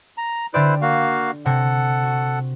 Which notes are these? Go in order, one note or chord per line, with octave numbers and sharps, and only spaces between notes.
A#5
D3 E4 G4 B4 C5 D5
A#3 F#4 F5
C3 A4 F#5
F#4